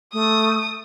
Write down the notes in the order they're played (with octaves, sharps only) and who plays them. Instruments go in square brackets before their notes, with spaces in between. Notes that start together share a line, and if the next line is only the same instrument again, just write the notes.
[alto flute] A3 [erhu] D#6